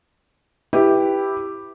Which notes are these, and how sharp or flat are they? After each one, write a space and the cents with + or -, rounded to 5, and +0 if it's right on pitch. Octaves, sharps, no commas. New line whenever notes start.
E4 +0 G4 +0 B4 +0